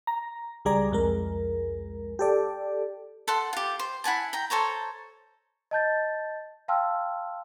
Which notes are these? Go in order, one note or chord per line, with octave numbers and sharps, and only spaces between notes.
A#5
C#2 G3 G#4 D5 A#5
C2 F2 G#3 A#4
G4 A4 D5
A4 F#5 C6
F4 G4
C5
E4 F#5 G#5 A5
G5 A#5
A4 C5 C#5 A#5
D#5 A5 G6 A6
F5 G5 A5 C6 E6 F6